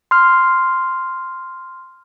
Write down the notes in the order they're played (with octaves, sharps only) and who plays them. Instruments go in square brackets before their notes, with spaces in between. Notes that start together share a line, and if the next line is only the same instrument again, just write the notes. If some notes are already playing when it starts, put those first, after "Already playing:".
[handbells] C6 F6